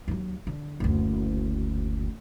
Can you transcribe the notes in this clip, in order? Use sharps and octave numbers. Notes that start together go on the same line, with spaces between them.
D#2 F#3
D3
F#1 D2